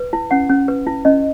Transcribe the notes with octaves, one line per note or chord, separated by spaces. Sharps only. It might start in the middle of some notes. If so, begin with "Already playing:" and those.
Already playing: B4
E4
C#4 F#5
C#4
B4
E4
C#4 D#5